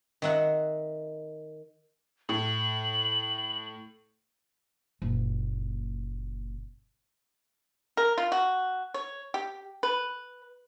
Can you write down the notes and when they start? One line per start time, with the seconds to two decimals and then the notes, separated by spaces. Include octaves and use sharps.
0.22 D#3 E5 F#5
2.29 A2 F#7
5.02 F#1 A#2
7.97 A#4
8.18 F4
8.32 F#4
8.94 C#5
9.34 G4
9.83 B4